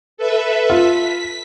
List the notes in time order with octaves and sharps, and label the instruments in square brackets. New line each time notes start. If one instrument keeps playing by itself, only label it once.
[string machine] A4 B4 E5
[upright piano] F4 [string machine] B6